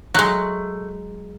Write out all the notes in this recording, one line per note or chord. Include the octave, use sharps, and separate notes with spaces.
F#3 G#3 A3 F#6